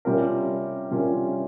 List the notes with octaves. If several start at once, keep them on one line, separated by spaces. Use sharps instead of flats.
C3 G3 C#4 F4 A#4
C3 G3 C#4 F4 A#4